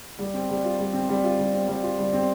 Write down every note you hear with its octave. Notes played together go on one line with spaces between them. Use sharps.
G3
C4
G3
F4
G3
C4
G3
F4
G3
C4
G3
F4
G3
C4